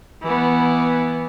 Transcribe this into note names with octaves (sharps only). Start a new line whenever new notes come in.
E3 B3